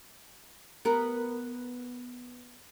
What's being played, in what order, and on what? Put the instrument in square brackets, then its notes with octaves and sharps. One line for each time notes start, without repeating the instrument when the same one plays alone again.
[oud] B3 A#4